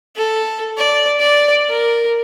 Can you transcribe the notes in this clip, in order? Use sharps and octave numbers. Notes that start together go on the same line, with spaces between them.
A4
D5
D5
A#4